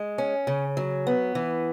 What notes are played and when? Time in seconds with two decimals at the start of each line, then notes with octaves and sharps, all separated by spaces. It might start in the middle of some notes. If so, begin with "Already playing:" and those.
Already playing: G#3
0.18 C#4
0.47 C#3
0.77 F#3
1.07 B3
1.35 E3